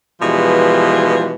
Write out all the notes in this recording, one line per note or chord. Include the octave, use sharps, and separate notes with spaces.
B2 E3 F3 G3 G#3